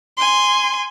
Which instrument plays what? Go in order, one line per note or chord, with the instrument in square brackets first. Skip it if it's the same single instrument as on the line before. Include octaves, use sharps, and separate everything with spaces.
[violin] G#5 C6